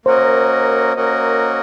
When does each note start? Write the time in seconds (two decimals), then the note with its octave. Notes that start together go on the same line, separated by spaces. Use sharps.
0.06 A#3 C#4 F#4 A#4 C5 D#5
0.97 A#3 C#4 F#4 A#4 D#5